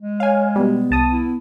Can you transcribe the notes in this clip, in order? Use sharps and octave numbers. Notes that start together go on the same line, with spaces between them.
G#3
C#5 F5 G#5
B2 G3 B3
C2 A5 D#6
E4